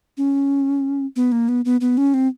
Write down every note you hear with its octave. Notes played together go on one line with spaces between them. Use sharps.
C#4
B3
A#3
B3
B3
B3
C#4
C4